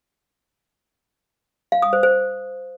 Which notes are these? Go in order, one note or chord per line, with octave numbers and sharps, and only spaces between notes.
F5
D#6
C5
C5